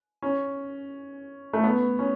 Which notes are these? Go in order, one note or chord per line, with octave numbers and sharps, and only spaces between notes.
C#4
A3
B3
C#4